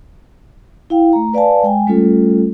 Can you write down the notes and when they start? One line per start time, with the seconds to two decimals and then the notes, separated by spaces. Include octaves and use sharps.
0.90 E4 F5 G5
1.13 A3 A#5
1.33 B4 D5 F5 G#5 A5
1.63 G#3 G5 G#5
1.87 G3 A3 C#4 F4 A4